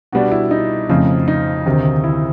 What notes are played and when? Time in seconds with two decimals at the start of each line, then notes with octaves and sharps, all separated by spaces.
0.12 B2 G3 B3 D4 F#4
0.32 E4
0.51 D#4
0.89 F2 C#3 F3 A3 C4
1.28 D#4
1.66 D2 C3 D#3
2.04 E4